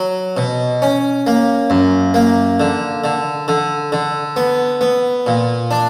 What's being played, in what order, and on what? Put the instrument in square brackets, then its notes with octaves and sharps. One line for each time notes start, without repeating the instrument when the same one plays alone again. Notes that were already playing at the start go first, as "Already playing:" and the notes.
Already playing: [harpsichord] F#3
B2
C#4
A#3
F#2
A#3
D3
D3
D3
D3
B3
B3
A#2
D4